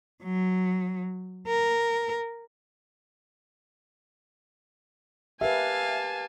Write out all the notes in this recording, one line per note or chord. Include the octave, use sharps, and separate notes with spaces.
F#3
A#4
G4 A#4 B4 E5 F5 G#5 A5